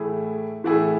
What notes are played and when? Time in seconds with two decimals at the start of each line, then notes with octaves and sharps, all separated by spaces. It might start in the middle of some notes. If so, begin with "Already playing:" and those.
Already playing: A2 E3 A3 E4 G#4
0.64 A2 E3 A3 E4 G#4